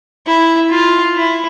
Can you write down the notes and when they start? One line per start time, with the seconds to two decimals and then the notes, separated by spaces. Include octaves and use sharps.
0.27 E4
0.70 F4
1.15 E4